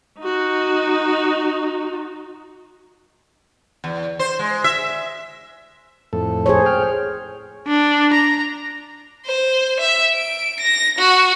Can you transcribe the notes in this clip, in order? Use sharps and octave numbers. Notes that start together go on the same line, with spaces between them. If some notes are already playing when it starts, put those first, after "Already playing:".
D#4 F#4
E2
C5
G#3
E5
F2 A2 A4
G#4 C5 C#5
G5 F6
D4
A#5
C5
E5
D7
A#6
F#4